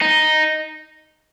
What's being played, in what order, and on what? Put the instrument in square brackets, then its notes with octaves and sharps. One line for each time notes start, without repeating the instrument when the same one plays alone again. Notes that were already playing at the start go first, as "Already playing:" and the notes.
[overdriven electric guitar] D#4